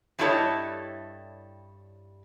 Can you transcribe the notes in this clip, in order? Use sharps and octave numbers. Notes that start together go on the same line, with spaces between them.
G2 G3 E4 A4 C#5 D#5